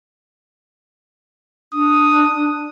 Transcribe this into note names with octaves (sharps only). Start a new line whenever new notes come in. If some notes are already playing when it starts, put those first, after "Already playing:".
D4 D#6